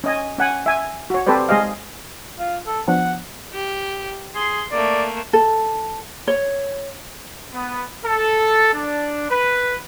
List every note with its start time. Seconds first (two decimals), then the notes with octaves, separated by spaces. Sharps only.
0.04 C#4 D#5 G#5
0.38 C#4 F#5 G#5
0.66 E5 G#5
1.10 F#4 C#5
1.26 C4 G4 A4 B4 C5 D5
1.49 G#3 G#4 D#5 F5
2.39 F4
2.66 A4
2.88 F3 B3 D4 F#5
3.53 G4
4.35 G#4 C6
4.72 A3 A#3 D5
5.33 A4
6.28 C#5
7.54 B3
8.06 A4
8.74 D4
9.30 B4